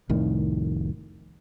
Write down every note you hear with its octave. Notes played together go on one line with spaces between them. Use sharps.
F1 C2 A2 D#3